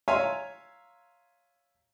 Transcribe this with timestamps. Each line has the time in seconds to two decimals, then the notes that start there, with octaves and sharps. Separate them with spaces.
0.08 C#5 E5 F5 G#5 A#5 C6